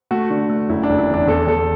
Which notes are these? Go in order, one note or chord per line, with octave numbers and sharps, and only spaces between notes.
A3 F#4
D3
A3
F#1 E4
D4
F#1
E4
E2
D4
E2 A4
E2 A4